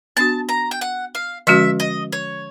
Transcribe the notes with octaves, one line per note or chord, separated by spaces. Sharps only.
B3 D4 F#4 A5
A#5
G5
F#5
F5
D3 F3 G#3 C#4 F#4 E5
D#5
C#5